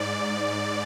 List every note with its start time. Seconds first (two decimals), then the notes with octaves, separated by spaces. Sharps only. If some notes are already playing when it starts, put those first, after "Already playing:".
Already playing: G#2 D5